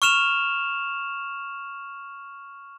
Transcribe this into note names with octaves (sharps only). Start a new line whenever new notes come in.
C#6 F6 E7 F7